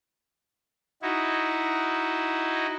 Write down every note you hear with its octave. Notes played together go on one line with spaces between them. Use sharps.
D#4 E4 F#4